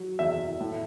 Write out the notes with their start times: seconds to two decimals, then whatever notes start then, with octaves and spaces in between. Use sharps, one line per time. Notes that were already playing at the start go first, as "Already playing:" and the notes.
Already playing: F#3
0.19 E2 E5
0.60 A2